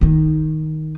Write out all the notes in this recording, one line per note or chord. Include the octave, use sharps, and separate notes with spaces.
D#3 D#4